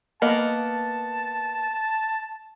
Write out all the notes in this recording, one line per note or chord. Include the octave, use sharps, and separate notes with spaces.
A#3 B3 D#5 A5